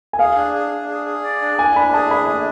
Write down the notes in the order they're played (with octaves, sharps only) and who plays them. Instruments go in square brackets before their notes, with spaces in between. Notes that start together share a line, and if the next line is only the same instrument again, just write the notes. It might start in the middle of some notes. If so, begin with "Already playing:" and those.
[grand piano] G#5
[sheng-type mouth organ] G#4 [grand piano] F5
[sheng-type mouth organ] D4
G#4
D4
G#4
G#4
D5
D4
[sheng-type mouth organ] D4 [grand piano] G#5
[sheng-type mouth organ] D4 [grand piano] B5
[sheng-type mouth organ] G#4 [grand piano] A5
[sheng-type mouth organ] D4 [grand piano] B5
[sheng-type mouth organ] D4